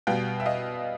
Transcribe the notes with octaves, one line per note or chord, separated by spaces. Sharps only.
B2 G3 B3 F5 G5
E5
D#5 F5